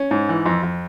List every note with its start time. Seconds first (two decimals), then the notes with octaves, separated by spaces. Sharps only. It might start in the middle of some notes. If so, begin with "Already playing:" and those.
Already playing: C#4
0.11 G#2
0.29 E3
0.46 F2
0.63 F2